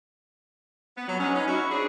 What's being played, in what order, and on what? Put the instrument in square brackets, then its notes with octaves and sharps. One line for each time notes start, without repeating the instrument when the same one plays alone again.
[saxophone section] B3
F#3
G#3 B3 C#4
C#4 D#4
E4 F#4
F#3 C4 D4 G#4